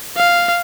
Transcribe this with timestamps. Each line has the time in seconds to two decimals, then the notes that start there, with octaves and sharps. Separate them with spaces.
0.17 F5